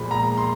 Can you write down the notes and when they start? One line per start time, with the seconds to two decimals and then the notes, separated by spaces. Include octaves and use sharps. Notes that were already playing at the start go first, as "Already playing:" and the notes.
Already playing: A#2 F3 G#3 B5
0.11 A#5
0.38 C6